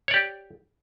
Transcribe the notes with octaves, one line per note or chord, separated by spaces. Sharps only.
G4 C#5 D5